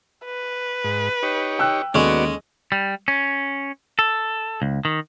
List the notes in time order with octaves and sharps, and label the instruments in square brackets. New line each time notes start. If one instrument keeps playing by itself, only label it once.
[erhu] B4
[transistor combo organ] G#2
D#4 G4 C#5
[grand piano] G5 E6 F#6
[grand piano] D#2 A4 [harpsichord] G#3 C#4 [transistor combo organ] B3 F#4 D5 [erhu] D#5
[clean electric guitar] G3
C#4
A4
C#2
D#3